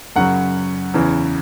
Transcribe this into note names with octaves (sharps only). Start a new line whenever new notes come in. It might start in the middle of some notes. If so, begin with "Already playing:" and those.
F#2 C#3 F#3 F#5
E2 C#3 E3